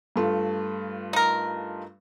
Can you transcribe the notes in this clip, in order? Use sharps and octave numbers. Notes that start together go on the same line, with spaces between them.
G2 A3 F4
D#4 A#4